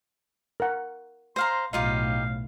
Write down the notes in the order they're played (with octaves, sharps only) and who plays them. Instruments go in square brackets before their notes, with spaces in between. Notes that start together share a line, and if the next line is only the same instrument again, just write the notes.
[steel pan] A#4 F#5
[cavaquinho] C5 F5 A#5 [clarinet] C6
[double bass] B1 A2 [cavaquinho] D#4 F4 G4 [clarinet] F5